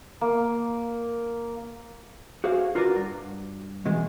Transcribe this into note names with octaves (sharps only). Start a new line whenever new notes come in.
A#3
F#4 G#4 C5 F5
F4 F#4 A#4 B4 D5
G2
B2 E3 G#3